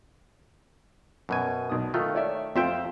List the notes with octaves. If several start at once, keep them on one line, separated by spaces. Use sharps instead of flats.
F#2 B2 G#5
B1 D#6
D#3 A3 F4
C#5 D5 E5
F2 C4 F4 C5 E5 G5